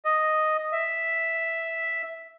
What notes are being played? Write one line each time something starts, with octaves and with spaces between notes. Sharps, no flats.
D#5
E5